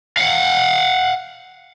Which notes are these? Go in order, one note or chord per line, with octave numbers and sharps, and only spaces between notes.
F5 F#5